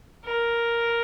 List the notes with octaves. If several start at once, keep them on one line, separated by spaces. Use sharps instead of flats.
A#4